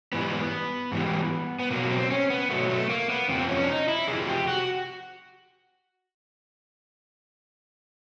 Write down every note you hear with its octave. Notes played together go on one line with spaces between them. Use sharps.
G#2 E3 G3 B3
G#2 E3 G3
B3
B2 F#3 A#3
C4
C#4
B3
B2 F#3 A3
A3
A#3
B3
F2 C3 F3 C4
C#4
D4
D#4
E4
F2 C3 F3 G#4
G4
F#4